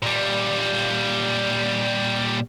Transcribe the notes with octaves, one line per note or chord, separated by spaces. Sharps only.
A#2 G3